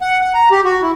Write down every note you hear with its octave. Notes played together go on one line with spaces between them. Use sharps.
F#5
F#5
A#5
G4
F#4
E4